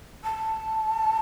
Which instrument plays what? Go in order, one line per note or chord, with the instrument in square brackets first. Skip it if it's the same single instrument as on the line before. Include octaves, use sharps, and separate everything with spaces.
[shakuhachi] A5